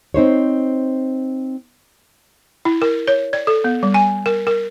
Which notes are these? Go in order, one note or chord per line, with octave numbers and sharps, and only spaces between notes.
C4 D#4 C5 C#5
E4
A#4
C#5
D5
A4
B3
G3
G#5
A#4
A#4